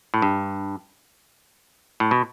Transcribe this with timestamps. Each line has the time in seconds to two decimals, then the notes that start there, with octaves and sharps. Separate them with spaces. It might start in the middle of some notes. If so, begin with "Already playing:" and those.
0.14 A2
0.22 G2
2.00 A2
2.11 B2